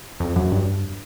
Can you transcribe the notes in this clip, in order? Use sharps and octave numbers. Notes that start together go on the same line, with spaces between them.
F2
F#2
G2